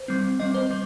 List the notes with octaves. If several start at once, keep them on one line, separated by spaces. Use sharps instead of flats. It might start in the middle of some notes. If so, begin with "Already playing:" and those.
Already playing: C5
G3 C4
G3 C4 D#5
C5
G3